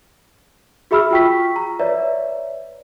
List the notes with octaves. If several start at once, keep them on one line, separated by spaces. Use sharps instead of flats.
F#4 G#4 E5 B5 E6 F6
F4 F#4 G5 C#6 B6
A#5
B4 C#5 D5 E5